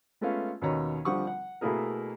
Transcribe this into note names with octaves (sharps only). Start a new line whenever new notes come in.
G#3 A3 B3 C#4 F4
D#2 B2 D#3 C#4 C#5 A#5
D3 F3 G3 F#5 C#6 D#6
F#5
B2 A3 A#3 E4 G#4 A#4